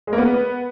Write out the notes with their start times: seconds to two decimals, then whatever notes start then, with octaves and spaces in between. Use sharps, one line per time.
0.07 G#3
0.13 A#3
0.18 B3